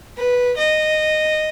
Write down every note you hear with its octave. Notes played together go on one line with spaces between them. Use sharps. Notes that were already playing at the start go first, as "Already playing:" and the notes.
B4
D#5